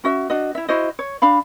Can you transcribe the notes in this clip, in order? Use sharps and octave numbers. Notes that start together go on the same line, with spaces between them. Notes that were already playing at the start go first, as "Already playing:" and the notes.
C#4 F#4 E5
D4 F#4 D#5
E4 E5
E4 F#4 C5 D#5
C#5
D4 F5 B5